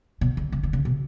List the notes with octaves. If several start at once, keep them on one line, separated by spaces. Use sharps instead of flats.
B2
D3
C#3
D3
C#3
B2